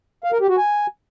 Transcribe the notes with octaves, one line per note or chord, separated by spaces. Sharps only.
F5
A#4
G4
F#4
G#5